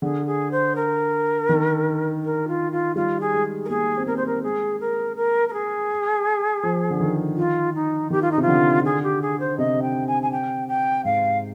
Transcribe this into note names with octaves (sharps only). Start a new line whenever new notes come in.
D3 G#4
G#4
C5
A#4
D#3
A#4
F4
F4
G3 F4
G#4
G#3
A#4
A#3 G#4
C4
A#3 A#4
C5
A#4
G#3 G#4
A#4
A#4
A#4
G#4
F3
D3
D#3
F4
D#4
D#3 G4
F4
D#4
C3 F4
D3
G#4
G4
G#4
C5
C3 D#5
G5
G#5
G#5
G5
G5
G#2 F5